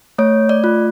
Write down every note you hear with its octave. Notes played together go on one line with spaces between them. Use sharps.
A3 C#5
D5
F4